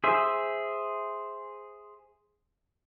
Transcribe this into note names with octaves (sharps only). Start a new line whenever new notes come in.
G#4 C5 E5